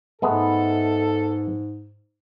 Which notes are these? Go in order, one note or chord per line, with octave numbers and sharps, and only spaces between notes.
G#2 G#3 A3 B3 A4